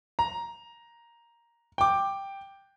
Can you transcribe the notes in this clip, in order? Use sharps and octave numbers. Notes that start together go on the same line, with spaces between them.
A#5
G5 D6